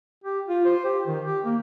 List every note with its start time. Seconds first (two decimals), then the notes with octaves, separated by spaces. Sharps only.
0.24 G4
0.48 F4
0.65 C5
0.85 G4
1.07 D#3
1.25 G4
1.45 A#3